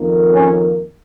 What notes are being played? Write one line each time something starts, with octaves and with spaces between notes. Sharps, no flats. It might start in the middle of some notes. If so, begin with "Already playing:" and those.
Already playing: F2 D#3 A#3
C#4